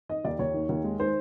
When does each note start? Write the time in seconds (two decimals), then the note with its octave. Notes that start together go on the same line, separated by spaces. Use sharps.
0.09 D#3 D#5
0.25 D#2 D5
0.39 D#2 C#5
0.54 D#3
0.69 D#2
0.84 G#3
0.99 D#3 C5